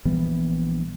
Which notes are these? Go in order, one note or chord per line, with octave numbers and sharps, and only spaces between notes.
A#1 E3 G3 B3